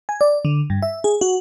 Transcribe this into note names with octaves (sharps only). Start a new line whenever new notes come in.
G#5
D5
D3
G2
E5
G#4
F#4